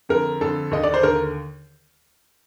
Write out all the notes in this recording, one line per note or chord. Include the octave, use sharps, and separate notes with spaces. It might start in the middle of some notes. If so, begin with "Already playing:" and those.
F2 D3 A#4
F2 D3 A4
D#2 D3 D#5
D5
C5
D#2 D3 A#4